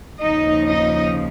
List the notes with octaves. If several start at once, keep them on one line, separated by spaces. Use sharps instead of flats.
D#2 C#3 F3 D#4 D#5
D#4 D#5